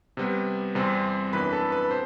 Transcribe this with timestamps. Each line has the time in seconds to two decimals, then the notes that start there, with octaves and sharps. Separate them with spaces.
0.17 C3 G3 B3
0.75 E2 C3 G3 C4
1.33 F#2 E3 B3 D4 B4 B5
1.53 A4 A5
1.72 B4 B5
1.91 C3 C5